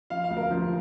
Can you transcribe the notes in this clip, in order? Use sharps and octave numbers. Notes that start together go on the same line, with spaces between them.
F3 F5
F5
D2
A#4
F3